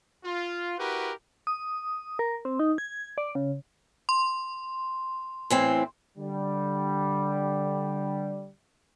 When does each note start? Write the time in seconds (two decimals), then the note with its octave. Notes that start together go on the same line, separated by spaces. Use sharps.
0.24 F4
0.79 E4 F#4 G4 A#4 B4
1.47 D#6
2.19 A#4
2.45 C4
2.59 D#4
2.78 G#6
3.18 D5
3.35 C#3
4.09 C6
5.50 A2 E3 C4
6.18 D3 G3